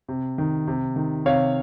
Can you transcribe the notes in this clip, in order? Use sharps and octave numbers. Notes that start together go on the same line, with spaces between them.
C3
D#3
C3
D#3
C3 C#5 F5